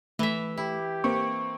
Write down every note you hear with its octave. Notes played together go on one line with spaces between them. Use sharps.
E3 A3 E5
E4 G4
A#3 C4 C#6